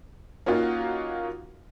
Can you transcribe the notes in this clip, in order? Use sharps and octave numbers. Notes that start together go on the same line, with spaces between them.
A#3 C#4 D#4 F4 F#4 F5